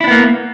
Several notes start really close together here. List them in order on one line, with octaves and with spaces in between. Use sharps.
E4 D4 B3 A#3